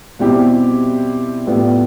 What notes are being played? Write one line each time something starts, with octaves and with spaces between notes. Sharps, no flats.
B2 G3 C4 E4 G4
A2 G3 B3 F4